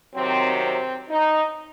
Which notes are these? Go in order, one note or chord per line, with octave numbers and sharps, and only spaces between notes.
C3 D#3 F#3 C4
C4
D#4